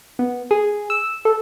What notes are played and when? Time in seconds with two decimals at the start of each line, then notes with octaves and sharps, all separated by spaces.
0.19 B3
0.51 G#4
0.90 E6
1.25 A4